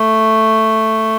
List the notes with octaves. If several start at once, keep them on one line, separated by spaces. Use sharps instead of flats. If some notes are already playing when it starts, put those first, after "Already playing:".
Already playing: A3